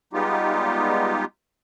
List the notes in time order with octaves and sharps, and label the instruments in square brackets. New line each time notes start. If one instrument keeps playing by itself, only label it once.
[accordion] G3 G#3 B3 D#4 F4 G4